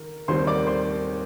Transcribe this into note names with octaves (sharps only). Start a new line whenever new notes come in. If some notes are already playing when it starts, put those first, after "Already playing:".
Already playing: D#3 A#4
D#2 D#3 G3 C4 C5 C6
D5 D6
C5 C6